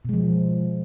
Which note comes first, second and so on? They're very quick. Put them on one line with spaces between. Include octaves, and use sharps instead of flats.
B2 G#3 F3